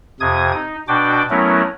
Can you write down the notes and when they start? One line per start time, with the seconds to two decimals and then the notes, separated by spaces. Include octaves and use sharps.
0.20 F2 C3 D#6 G#6
0.55 D#4
0.88 B2 D4 F#4 G5 D6
1.30 F#3 A3 B3 C#4 E4 A#4